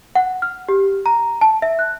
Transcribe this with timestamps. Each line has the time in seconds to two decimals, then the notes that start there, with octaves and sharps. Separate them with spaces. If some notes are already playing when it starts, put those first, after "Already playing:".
0.15 F#5
0.42 F6
0.69 G4
1.06 A#5
1.41 A5
1.62 E5
1.79 F#6